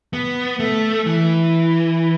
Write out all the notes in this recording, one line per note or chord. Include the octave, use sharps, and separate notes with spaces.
B3
A3
E3